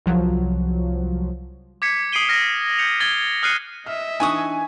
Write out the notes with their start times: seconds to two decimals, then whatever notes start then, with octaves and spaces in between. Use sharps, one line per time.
0.06 C2 F3 F#3
1.82 D6 G#6 B6 C#7
2.13 D#6 C7 D7 D#7 G7
2.29 F6 A#6
2.79 G6 C#7 F7
3.00 D#6 G#6 A6 G7
3.43 D#6 F6 F#6 C7 C#7 D#7
3.86 D#5 E5 F6
4.20 E3 D4 D#4 B4 G#5 C#6 D#6